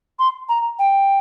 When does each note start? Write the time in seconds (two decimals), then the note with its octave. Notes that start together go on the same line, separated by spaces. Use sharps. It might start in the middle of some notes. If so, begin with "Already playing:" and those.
0.19 C6
0.49 A#5
0.79 G5